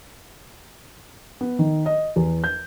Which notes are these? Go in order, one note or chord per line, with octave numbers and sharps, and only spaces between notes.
B3
D#3
D#5
E2
G6